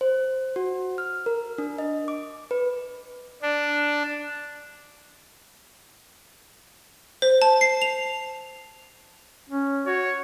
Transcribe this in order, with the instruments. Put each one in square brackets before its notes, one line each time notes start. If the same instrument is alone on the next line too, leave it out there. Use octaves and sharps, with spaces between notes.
[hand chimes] C5
F#4
F6
A#4
D4
D#5
D6
B4
[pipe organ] D4
[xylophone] C5
A5
C7
F7
[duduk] C#4
[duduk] F#4 [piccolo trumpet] C#5